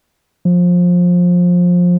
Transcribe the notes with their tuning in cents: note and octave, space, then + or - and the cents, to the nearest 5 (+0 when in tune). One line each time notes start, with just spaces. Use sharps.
F3 +20